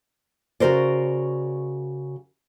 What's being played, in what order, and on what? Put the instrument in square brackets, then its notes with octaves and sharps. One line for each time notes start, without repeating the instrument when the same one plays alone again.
[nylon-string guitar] C#3 F#4 A#4 C5 D5